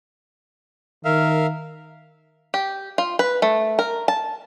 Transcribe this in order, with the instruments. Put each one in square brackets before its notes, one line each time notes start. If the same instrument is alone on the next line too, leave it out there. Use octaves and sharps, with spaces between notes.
[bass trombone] D#3 [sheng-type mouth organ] A#4 E5 F5
[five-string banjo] G4
F4
B4
A3
A#4
A5